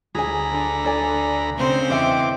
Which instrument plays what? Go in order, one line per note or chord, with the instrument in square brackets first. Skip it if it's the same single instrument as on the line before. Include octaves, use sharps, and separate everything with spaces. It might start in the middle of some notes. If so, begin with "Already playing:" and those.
[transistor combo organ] D2 A#5 B5 [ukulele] G#4 G#5
[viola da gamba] D3 [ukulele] C5
[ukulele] A4 D5 G#5
[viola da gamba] C#3 C4 C5
[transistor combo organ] E2 D6 [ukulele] D#5 E5 G5